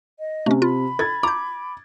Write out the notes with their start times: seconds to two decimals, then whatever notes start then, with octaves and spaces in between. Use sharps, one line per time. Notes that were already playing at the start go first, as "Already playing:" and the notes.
0.19 D#5
0.46 C3 A3 C#4
0.62 F4 B5
0.99 A4 G#6 A6
1.23 A#5 D6 G6